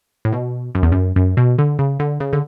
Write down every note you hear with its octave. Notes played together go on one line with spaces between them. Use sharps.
A2
B2
F#2
E2
F#2
F#2
B2
D3
C#3
D3
C#3
D3